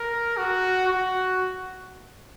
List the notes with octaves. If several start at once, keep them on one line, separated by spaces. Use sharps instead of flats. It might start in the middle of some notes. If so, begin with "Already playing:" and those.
Already playing: A#4
F#4
F#4